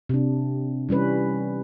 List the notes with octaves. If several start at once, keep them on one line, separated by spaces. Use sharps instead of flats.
C3 D4
E3 G3 C#4 B4